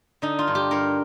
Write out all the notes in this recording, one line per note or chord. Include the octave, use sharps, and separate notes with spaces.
D3 D#4
F4
G2
G4
G2 A#4